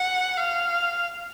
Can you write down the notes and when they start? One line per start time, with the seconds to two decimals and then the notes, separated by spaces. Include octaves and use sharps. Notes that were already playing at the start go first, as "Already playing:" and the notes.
Already playing: F#5
0.37 F5